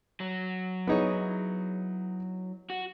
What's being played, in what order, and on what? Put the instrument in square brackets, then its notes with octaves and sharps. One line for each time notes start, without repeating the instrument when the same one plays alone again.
[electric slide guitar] F#3
[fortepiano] B3 D#4 [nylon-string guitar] E4 G#4 C#5
[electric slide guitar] F#4